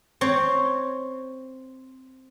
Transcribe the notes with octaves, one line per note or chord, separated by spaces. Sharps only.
C4 C#5